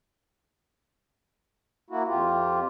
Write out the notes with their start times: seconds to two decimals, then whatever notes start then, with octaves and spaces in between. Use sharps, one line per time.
1.90 A#3 E4 F#4
2.08 F2 F4 G4